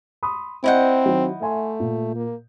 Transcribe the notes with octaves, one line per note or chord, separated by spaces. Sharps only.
B5 C6 D#6
C4 E4 C5 D5 D#5 F#5 G6
D#3 F#3
A3 E5 G#5 C6
A#2
A#3